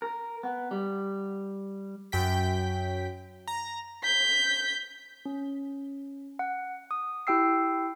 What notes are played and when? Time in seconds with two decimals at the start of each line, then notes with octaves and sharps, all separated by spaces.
0.02 A#4
0.43 B3
0.71 G3
2.12 F#2 G5 B6
3.48 A#5
4.03 G6 B6
5.25 C#4
6.39 F#5
6.91 D#6
7.27 E4 G4 G5 E6 C7